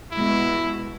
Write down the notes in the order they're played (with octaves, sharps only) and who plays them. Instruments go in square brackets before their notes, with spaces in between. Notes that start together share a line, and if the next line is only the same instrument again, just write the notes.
[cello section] B2 G#3 [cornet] E4